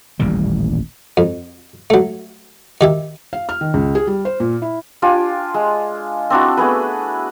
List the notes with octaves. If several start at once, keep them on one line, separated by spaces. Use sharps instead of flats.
D#1 A1 A#2 G3
F2
F#3 A3
D#3 G4 E5
F5
F6
D#3
C#2
G#4
G3
C5
A#2
E4
D4 F4 G4 G#5
G#3
C4 D4 E4 F#4
A3 B3 G#4 B4